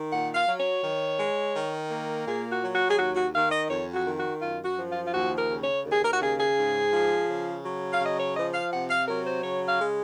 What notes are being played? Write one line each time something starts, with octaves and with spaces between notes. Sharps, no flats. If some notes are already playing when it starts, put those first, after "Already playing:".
Already playing: D#3
A#2 F#5
F5
F#3
C#5
D#3
G#3
D#3
A#3
A#2 G#4
F#4
F#3
F#4
G#4
D#2 F#4
F#4
D#3 F5
D#5
F2 C#5
F#4
D#3
F#4
F#2 F4
F#4
F3
F4
F4
D#2 F#4
A#4
C#3
C#5
D#2
G#4
A#4
F#4
C#3 G#4
G#4
G#2
F3
C#3
F#3
F5
C#3
D#5
C#5
F3 D#5
F5
C3 F#5
F5
F#3 A#4
C5
C#3 C#5
F5
G#3